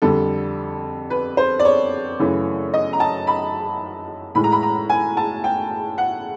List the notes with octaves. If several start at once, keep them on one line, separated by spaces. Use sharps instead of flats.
F2 D3 G3 A4
B4
C5
D5
C#5
F#2 C#3 E3 A3
D#5
A#5
A5
B5
A2 E3 G#3 B5
A#5
B5
A#5
G#5
A5
G5
F#5